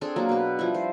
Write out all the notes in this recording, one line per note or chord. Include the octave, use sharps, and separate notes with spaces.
C4 D4 G#4 A4
F#3 A#3
B2 B4
F3 G3 E4
C5